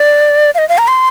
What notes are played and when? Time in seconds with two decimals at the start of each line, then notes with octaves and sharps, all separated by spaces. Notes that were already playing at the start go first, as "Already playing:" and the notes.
Already playing: D5
0.55 F5
0.58 D#5
0.69 F5
0.78 A#5
0.88 C6